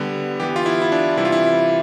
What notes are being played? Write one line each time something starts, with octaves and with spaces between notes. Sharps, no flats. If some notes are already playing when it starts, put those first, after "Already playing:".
Already playing: D3 G3 B3
E3 B3 G4
F4
E4
E4
D4
C3 E3 G3 E4
F4
E4